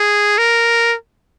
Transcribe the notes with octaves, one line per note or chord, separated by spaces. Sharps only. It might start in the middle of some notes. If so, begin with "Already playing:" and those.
Already playing: G#4
A#4